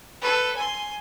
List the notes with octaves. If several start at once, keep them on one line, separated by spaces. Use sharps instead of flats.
A4 B4
G#5 C6